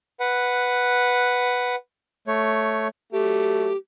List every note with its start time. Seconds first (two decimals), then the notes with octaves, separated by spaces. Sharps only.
0.20 B4 F#5
2.27 A3 C#5
3.12 F#3 A3 G4